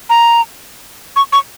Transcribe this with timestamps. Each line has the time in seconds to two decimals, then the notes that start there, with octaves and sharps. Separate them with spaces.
0.10 A#5
1.16 C#6
1.32 C#6